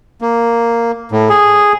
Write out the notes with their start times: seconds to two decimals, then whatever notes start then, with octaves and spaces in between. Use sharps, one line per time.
0.21 A#3
1.11 A2
1.30 G#4